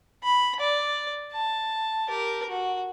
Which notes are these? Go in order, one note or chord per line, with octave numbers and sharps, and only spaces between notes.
B5
D5
A5
G4 A#4
F#4